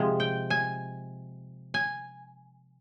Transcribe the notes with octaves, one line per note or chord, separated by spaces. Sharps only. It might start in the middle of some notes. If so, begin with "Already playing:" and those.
Already playing: C3 F3 G#3
G5
G#5
G#5